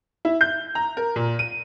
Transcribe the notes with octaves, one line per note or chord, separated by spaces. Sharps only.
E4
G6
A#5
A#4
A#2
D#7